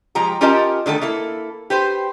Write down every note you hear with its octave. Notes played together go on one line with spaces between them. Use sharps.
F3 G#3 G4 A#5
C#4 F4 G4 A#4 D#5 A5
D3 D#3 A3 A4
A#3 E4 A4
G4 B4 C5